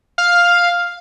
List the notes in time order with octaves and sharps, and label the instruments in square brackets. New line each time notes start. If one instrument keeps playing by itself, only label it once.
[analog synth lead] F5